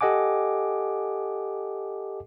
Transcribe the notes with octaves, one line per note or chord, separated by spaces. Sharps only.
G4 A4 D#5 F#5 G#5 D6